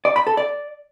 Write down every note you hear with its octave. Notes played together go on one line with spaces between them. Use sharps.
D5
B5
A4
D5